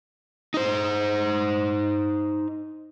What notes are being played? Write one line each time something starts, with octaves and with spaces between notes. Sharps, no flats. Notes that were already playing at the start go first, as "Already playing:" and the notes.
D#4 C5